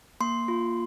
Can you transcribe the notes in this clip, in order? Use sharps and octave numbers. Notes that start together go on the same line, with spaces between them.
A#3 C6
F4